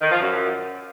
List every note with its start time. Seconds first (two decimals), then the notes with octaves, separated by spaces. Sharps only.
0.01 D#3
0.11 F3
0.21 F#2